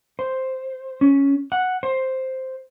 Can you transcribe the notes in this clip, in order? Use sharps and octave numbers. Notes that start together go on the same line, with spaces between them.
C5
C#4
F#5
C5